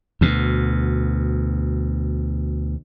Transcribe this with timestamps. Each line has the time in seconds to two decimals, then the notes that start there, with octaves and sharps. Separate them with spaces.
0.21 D2 B2